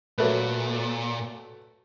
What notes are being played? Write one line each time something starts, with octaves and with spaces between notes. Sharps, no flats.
A#2 F#3 A3 B4